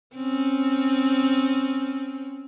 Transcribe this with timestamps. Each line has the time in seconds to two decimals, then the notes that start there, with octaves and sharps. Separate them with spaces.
0.15 C4 C#4